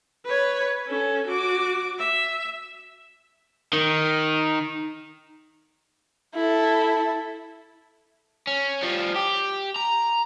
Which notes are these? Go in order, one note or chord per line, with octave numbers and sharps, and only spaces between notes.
B4 C#5
C#4 A4
F#4 D6
E5
D#3
E4 A4
C#4
F3 G3
G4
A#5